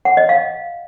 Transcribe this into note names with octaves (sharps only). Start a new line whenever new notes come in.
F#5
D#5
F5